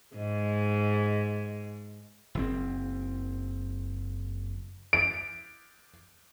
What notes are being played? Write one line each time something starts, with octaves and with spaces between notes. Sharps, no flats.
G#2 G#3
F#1 C4
D7